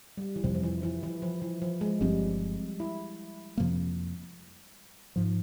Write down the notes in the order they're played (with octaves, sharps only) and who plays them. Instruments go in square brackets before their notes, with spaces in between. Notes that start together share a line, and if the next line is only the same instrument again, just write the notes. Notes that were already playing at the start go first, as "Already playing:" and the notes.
[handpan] G3
E3
[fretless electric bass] F2 C3 G3 [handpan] F3
[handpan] F3
E3
E3
E3
F3
E3
F3
G#3
[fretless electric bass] G1 G2 F3 C4 [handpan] G3
[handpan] E4
[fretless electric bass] F2 C3 F3 A#3
G#2 F3